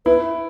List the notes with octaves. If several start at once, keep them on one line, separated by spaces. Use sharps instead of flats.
E4 B4